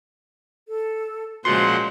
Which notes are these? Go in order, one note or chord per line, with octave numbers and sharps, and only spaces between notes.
A4
A#2 C#3 F3 G#3 F#4 C5 F#5 C6